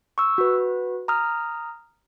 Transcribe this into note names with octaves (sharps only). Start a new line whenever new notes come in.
C#6 E6
F#4 B4
A#5 D#6 F6